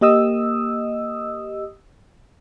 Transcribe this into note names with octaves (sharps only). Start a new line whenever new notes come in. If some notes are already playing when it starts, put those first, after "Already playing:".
A#3 G4 D#5 D#6 E6